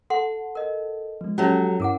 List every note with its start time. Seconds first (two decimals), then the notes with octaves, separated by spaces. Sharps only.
0.10 A4 F#5 C6
0.55 A#4 D#5
1.21 F3 G#3
1.38 F#3 C#4 G4 A4 C#5 E5
1.80 G2 E4 A#4 F#5 D6